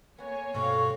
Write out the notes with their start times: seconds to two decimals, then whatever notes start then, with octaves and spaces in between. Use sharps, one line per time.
0.18 A#3 B3 F#4 C#5 G#5
0.54 G2 B2 G3 A3 C4 C#5 F5 C#6